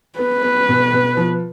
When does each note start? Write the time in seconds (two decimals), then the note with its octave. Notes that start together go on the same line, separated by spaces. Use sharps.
0.19 B3 B4
0.43 B3
0.69 B2
0.93 B2
1.17 F3